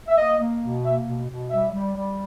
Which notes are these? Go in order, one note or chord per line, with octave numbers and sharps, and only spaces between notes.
E5
A#3 D#5
A#3
B2
A#3 E5
B2
B2
G3 E5
G3
G3